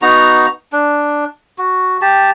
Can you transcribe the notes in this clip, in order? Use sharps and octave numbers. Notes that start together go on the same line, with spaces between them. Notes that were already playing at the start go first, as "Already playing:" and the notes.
B3 D#4 F#4 A#5
D4
F#4
G4 A5